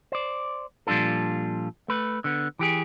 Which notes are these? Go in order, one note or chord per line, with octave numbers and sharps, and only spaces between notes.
C5 D5
A#2 F3 G3 D4 F4 A4
A3 B4
D3 B3
E3 G4 G#4